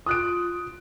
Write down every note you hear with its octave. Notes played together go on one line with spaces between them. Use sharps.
F4 D#6 F#6 D7